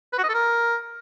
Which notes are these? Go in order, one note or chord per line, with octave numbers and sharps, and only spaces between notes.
B4
F#4
D#5
A4
A#4